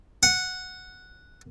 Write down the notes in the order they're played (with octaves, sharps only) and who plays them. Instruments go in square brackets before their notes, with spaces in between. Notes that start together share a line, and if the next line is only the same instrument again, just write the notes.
[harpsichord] F#5